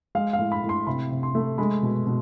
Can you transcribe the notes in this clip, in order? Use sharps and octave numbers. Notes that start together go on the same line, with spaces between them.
G#3 F5
F5
A2
B5
A2
C6
C3 B5
C3
C6
A3
G#3 B5
B2
B2